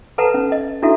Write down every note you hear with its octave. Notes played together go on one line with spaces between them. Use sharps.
A4 B4 F#5 A5 A#5
C#4
D#5
D4 E4 F#4 A4 E5